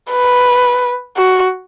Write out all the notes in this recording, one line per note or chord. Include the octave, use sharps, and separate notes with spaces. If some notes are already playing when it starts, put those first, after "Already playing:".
B4
F#4